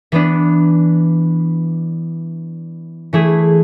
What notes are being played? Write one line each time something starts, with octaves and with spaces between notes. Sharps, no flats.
E3 B3 D4
E3 A3 E4 G#4